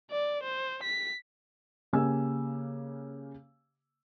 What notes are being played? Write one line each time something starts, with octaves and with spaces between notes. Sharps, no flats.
D5
C5
B6
C#3 A#3 G4 G#5 E6